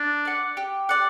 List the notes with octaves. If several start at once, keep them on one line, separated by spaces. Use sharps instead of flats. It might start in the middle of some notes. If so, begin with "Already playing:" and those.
Already playing: D4
D5 F#5
G4
D5 F#5